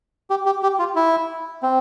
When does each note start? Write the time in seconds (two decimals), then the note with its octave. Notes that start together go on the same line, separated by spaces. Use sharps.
0.30 G4
0.46 G4
0.63 G4
0.79 F4
0.96 E4
1.63 C4